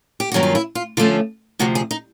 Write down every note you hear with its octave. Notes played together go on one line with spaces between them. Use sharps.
G4
G2 D#3 F#3 A#3 C#4 F#4
F4
E4
F4
D3 F3 A3 C#4 F4
D2 C3 F3 F#4
G#4
D#4